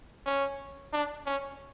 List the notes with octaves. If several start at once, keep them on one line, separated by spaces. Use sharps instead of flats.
C#4
D4
C#4